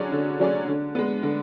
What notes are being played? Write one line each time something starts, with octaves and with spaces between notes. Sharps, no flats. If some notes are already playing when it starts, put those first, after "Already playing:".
Already playing: D3 F#3 C#4 G#4 D5
D3
F#3 C#4 G#4 D5
D3
G#3 B3
D3